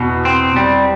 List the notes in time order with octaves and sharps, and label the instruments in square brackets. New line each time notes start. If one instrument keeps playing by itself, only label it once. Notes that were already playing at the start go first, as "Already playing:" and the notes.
Already playing: [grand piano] E2 E3 [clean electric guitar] B2
[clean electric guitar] C4
G3